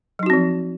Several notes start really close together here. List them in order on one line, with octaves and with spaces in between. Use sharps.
F#3 D#4 F#4 C4 F3